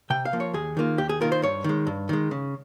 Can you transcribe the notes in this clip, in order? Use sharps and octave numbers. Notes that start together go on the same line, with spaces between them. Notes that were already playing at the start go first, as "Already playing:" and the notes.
C3 G5
F5
F3 A#3
C#5
D#2 G#4
D#3 A#3 F4
D#2 G4
G#4
D#3 A#3 F4 A#4
C5
G2 C#5
D#3 G#3
G2
D#3 G#3
C#3